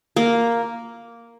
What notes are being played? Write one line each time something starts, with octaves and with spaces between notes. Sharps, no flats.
A#3